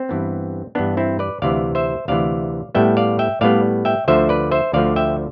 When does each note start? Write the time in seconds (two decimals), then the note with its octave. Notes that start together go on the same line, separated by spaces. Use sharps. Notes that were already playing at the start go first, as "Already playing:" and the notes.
Already playing: C4
0.09 G2 E3 B3
0.75 G2 E3 B3 D4
0.97 C4 E4
1.19 B4 D5
1.42 D2 C3 E3 D5 F5
1.75 C5 E5
2.08 D2 C3 E3 D5 F5
2.75 A2 G3 B3 E5 G5
2.97 D5 F5
3.19 E5 G5
3.41 A2 G3 B3 D5 F5
3.85 E5 G5
4.08 D2 D3 F3 C5 E5
4.29 B4 D5
4.51 C5 E5
4.73 D2 D3 F3 D5 F5
4.96 E5 G5